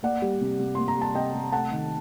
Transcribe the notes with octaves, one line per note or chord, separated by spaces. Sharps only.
A#3 D5 F#5
G3
C3
C3
A#3 C6
A#5
G3 A5
C3 D#5 G5
C3
A3 F#5 A5
D#3